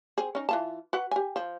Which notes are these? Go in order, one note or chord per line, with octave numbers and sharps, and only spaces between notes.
C4 G#4
C#4 D#4
E3 F4 A5
F#4 B4 F#5
G4 G#5
F3